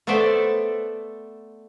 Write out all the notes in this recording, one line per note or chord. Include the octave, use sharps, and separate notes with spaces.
A3 B3 A4 C5 D5 E5